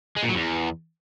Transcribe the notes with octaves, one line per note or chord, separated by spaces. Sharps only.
G#3
A#2
F#3
E2